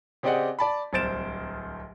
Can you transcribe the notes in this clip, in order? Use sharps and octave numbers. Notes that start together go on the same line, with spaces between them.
C#3 C4 G4 D5 D#5 F#5
D5 A5 B5
D1 C2 C5 A6 D7 E7